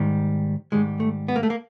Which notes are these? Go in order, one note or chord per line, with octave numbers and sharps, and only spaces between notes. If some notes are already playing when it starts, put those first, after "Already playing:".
Already playing: G#2 D#3 G3
G#2 D#3 G3 G#3
A3
B3
A#3
A3
A#3